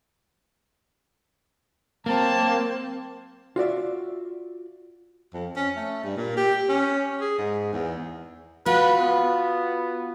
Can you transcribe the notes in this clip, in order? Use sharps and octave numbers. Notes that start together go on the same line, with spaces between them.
F#3 A#3 C4 A5
F4 F#4 D5 E5
F2
C#4
A3
G2
A#2
G4
C#4
G#4
G#2
E2
F4 F#4 B4
B3